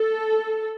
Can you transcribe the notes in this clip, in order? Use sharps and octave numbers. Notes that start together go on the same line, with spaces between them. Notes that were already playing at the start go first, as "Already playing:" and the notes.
Already playing: A4